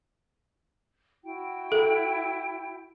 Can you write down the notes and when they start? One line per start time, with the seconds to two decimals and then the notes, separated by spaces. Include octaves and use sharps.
1.24 E4 F#4 G5
1.72 A4